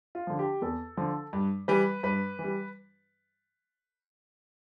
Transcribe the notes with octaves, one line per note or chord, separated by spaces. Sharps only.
F4
D3 F3
G4
E2 A4
D3 F3
G2
E3 G3 B4
G2 B4
E3
G3